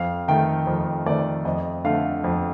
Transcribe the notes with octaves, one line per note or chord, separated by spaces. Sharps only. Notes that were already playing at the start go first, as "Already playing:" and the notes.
Already playing: F2 F5
D#3 A3 G5
F2
D#3 A3 D5
F2 D#5
D3 A3 F5
F2